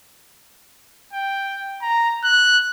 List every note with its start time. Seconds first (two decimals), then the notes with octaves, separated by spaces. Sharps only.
1.13 G5
1.82 A#5
2.24 F#6